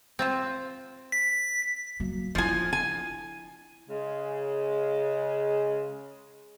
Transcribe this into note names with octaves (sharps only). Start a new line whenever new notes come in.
C4 F4 C5
B6
F#3 A#3
F3 D4 E4 G#5
G#5
C#3 G#3